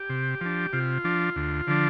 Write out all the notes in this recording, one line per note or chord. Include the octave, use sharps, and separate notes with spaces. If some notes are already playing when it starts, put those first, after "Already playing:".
Already playing: G4
C3
F3 D4
C3 F4
F3 D4
D2
D3 F3 D4